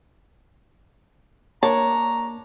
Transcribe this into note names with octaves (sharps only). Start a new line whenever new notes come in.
A#3 D4 C#5 A5 A#5